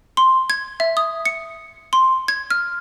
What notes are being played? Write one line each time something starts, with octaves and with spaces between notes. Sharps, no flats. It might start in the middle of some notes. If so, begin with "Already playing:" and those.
C6
G#6
E5
D#6
C#7
C6
G#6
F6